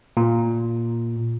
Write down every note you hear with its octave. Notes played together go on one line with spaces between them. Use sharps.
A#2